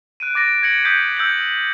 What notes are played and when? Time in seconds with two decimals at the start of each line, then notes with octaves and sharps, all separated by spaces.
0.20 F#6 D7 D#7
0.35 D6 A6 A#6 D7
0.63 G#6 A#6 C#7 F#7
0.84 D#6 G6 B6 C#7
1.17 E6 G6 B6 C#7 F#7